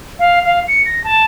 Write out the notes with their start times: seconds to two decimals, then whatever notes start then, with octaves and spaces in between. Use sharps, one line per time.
0.19 F5
0.44 F5
0.68 C#7
0.86 A#6
1.04 A5